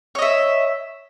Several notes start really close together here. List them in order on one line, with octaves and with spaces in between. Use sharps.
C#5 D#5 E5